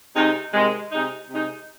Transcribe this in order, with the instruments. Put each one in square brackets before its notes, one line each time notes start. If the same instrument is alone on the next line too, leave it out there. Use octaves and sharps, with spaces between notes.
[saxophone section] C3 G#3 D#4
C3 D#3 G#3
C3 G#3 D#4
C3 G#3 D#4